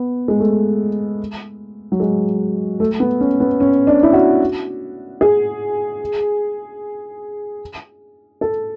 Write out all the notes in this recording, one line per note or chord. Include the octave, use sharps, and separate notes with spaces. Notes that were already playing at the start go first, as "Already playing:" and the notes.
Already playing: B3
G#3
A3
F#3
G#3
A3
B3
C#4
B3
C#4
D4
E4
F#4
G#4
A4